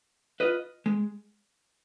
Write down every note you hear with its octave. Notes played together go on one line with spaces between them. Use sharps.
F4 B4 D#5
G#3